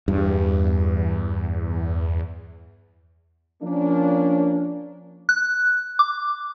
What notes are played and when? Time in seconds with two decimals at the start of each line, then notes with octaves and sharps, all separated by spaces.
0.08 E2 G2
3.63 F3 A#3 C#4 D4
5.29 F#6
5.99 D6